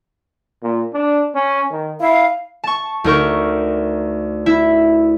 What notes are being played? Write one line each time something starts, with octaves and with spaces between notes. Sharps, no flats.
A#2
D4
C#4
D#3
E4 F5
A5 C#6
D2 D#4 A#4 C#6
E4